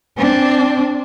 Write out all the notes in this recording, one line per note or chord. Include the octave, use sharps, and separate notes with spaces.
C4 D4